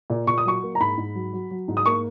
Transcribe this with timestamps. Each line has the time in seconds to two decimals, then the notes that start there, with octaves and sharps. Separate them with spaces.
0.10 A#2
0.27 A#2 C#6
0.38 D#6
0.45 F#3 C#6
0.63 A#3
0.75 A#5
0.80 G#2 B5
0.98 G#2
1.15 F#3
1.33 F#3
1.51 F#3
1.68 G#2
1.77 D#6
1.86 A#3 C#6